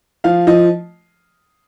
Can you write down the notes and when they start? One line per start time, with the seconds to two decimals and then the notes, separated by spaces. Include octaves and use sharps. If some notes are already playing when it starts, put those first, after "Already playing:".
0.24 F3 F5
0.47 F3 D#5